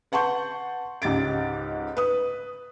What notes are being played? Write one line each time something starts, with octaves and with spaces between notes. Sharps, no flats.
B4 F#5 A5 C6 C#6 G6
C#2 G#2 G4 A6 D7
B4 D#6